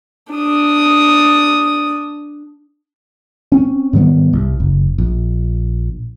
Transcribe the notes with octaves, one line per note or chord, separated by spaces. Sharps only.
D4 D#6
C4 C#4
G#2 D#3 G3 B3
C2
F#1
A#1